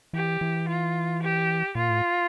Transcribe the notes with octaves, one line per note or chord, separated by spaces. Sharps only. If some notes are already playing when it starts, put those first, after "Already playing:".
E3 G4
E3
F4
G4
A#2 F4
A2